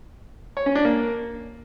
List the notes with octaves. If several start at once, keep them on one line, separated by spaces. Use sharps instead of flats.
C#5
C#4
D4
A#3